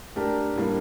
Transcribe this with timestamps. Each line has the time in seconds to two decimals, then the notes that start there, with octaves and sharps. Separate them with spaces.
0.16 A3 D4 G4 A#4
0.56 A2 G3 A#3 D4